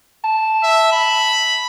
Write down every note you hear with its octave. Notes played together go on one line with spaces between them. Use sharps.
A5
E5
B5